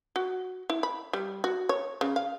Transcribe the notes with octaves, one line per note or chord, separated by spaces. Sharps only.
F#4
E4
B5
G3
F#4
C#5
C#3
F5